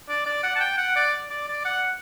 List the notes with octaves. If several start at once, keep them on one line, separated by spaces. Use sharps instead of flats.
D5
D5
F#5
A5
G5
F#5
D5
D5
D5
F#5